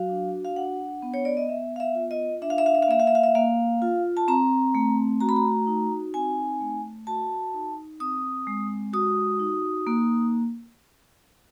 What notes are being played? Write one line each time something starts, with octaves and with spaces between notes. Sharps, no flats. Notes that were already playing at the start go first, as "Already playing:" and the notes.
Already playing: F#3 F#4 F5
D4
F5
D4 F#5
B3
C#5
D5
D#5
B3 E5
F5
E5
F4
D#5
D4 E5
F5
E5
F5
E5
F5
A#3 E5
F5
E5
F5
E5
A#3 F5
F4
A5
C4 A#5
A3
F#4 A#5
B5
A#5
D#4
C4 G#5
A3
F#4 A5
D#4
C4 D#6
G#3
F#4 D#6
D#4
A#3